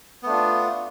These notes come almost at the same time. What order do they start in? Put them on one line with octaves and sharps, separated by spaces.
B3 A3 D4 F4